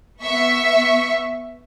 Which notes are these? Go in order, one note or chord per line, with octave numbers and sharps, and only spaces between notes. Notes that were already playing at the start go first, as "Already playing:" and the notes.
B3 E5 C#6